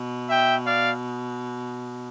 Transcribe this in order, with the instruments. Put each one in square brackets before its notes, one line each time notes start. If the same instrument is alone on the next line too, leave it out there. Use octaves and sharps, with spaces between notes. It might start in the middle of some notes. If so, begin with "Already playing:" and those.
Already playing: [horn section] B2
E5 G5
D5 F5